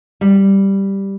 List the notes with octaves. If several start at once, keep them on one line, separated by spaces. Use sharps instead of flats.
G3